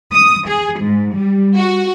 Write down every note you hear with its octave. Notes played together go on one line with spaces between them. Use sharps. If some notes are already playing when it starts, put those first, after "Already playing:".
D#6
G#4
G#2
G3
F#4